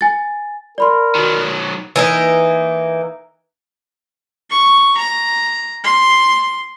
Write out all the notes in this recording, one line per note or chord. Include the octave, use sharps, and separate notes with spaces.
G#5 A6
A#4 D5 B5 C6
D#3 F#3
E3 A#3 D#4
C#6
A#5
C6